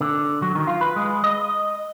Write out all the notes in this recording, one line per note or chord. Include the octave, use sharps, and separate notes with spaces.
D3
F#3
D#3
F4
B4
G#3
D#5